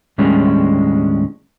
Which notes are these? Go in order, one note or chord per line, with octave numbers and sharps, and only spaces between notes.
D#2 A2 G3 G#3 C#4 D4